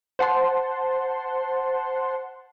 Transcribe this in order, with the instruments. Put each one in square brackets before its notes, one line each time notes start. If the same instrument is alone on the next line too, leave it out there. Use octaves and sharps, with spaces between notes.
[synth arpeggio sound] C5 F#5 A5 C6